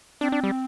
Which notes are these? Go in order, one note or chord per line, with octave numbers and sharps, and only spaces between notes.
C4 D4
D4
G3